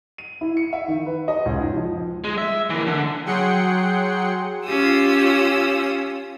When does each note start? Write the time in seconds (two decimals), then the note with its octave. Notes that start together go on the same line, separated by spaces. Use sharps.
0.18 D#7
0.41 E4
0.57 C#7
0.73 E5
0.88 D#3
1.06 B4
1.28 D#5
1.46 C#2
1.59 D#4
1.73 F3
2.24 G#3
2.38 E5
2.70 E3 A#3
2.87 D3
3.26 F#3 G#4 F#5 G5 C6 C#7
4.64 C#4 F4 G4 D#6 E6